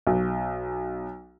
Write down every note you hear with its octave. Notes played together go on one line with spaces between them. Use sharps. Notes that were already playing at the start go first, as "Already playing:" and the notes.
B1